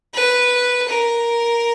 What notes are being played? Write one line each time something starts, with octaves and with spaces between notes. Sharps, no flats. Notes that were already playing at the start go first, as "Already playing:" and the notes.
B4
A#4